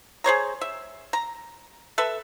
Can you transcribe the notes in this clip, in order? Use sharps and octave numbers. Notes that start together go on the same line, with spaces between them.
G#4 C5 C#5 A#5
E5
A#5
A4 B4 E5